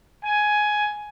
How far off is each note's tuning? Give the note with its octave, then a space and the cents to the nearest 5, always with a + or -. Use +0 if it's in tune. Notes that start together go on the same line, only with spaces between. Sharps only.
G#5 +10